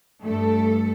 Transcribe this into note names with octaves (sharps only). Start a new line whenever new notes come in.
G2 A3 A4